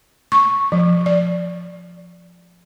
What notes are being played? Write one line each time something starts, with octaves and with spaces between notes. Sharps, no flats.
C#6
F3
D5